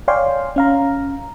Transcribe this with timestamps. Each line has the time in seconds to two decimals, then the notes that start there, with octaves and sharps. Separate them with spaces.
0.08 C#5 D5 F5 G5 G#5 C6
0.56 C#4 F5 A#5